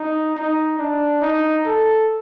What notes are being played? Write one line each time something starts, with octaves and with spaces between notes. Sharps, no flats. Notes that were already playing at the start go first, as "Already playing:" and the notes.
Already playing: D#4
D#4
D4
D#4
A4